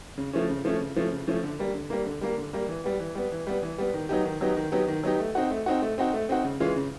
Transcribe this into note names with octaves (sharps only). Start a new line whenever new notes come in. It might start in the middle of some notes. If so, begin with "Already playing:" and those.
C#3
F3 A3 C#4
C#3
F3 A3 C#4
C#3
F3 A3 C#4
C#3
F3 A3 C#4
D3
G3 A#3
D3
G3 A#3
D3
G3 A#3
D3
G3 A#3
E3
G3 B3
E3
G3 B3
E3
G3 B3
E3
G3 B3
D#3
F#3 B3 D#4 G4
D#3
F#3 B3 D#4 G4
D#3
F#3 B3 D#4 G4
D#3
F#3 B3 D#4 G4
A3
C4 D#4 F#4
A3
C4 D#4 F#4
A3
C4 D#4 F#4
A3
C4 D#4 F#4
C#3
E3 G#3 C#4 F4
C#3